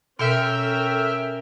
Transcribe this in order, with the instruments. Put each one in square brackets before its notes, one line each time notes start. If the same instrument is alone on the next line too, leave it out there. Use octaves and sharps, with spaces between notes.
[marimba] B2 [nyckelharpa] C#4 A#4 [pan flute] A4 [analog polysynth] E5 G5 F6